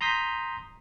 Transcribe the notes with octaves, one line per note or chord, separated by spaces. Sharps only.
A#5 C6 D#6 G6 B6